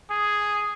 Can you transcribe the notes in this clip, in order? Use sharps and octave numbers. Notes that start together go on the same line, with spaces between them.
G#4